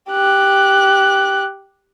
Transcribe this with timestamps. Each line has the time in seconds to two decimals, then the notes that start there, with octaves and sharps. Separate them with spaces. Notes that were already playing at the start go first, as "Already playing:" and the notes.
0.11 G4 F#6